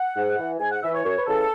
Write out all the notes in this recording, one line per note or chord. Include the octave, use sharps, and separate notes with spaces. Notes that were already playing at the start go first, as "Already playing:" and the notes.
Already playing: F#5
G#2
E3
G#2 G#5
F#5
E3 E5
C#5
F#2 C#5
B4
C#3 E3 A4